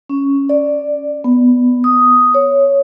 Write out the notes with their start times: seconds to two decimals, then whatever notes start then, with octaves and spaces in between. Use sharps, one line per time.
0.09 C#4
0.49 D5
1.24 B3
1.84 D#6
2.34 C#5